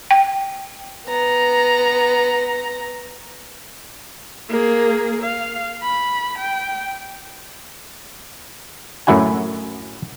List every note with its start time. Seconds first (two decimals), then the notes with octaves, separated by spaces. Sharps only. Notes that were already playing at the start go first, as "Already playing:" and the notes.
0.11 G5
1.07 B3 A#5
4.49 A#3 G#4
5.22 F5
5.82 B5
6.38 G5
9.07 F#2 A2 F#3 E4 F#4 G#5